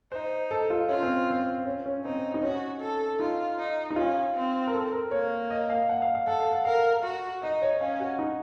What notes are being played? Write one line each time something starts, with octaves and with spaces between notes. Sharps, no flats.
D#4 C5
A4
F4
C#4 F4
C4
C4
C#4
C#4
C4 D#4
D#4
C#4 F#4
A4
D#4 F4
D#4
D#4
C#4 F4
C4
A#4
A4
A#4
A#3 C#5
D#5
F5
F#5
F5
F5
A4 F#5
F5
F#5
A#4 F5
F#4
D#4 D#5
C#5
C#4 F5
F#4
D#4